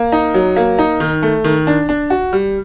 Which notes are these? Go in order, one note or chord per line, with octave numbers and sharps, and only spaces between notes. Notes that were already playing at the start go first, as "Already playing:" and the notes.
Already playing: A#3
D#4
F#3
A#3
D#4
D#3
A3
D#3
D4
D4
F#4
G3